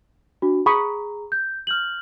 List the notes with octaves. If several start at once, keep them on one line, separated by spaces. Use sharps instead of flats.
D4 F#4
G#4 A#5 B5 C#6 D#6
G6
F6 G6 F#7